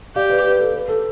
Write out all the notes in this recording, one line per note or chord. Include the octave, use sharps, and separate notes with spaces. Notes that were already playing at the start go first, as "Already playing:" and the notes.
G4 D5 F5
B4 D5
B4
A4
B4
A4